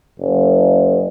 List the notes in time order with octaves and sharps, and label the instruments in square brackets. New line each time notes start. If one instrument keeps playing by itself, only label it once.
[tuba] F#1